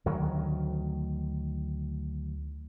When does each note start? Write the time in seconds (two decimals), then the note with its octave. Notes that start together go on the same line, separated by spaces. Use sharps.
0.06 D2 D#3 F#3